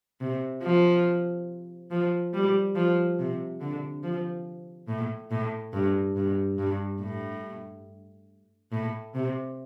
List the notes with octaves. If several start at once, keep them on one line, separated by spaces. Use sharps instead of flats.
C3
F3
F3
G3
F3
C3
D3
F3
A2
A2
G2
G2
G2
A2
A2
C3